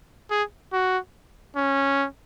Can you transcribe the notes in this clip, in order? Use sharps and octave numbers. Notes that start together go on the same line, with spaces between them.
G#4
F#4
C#4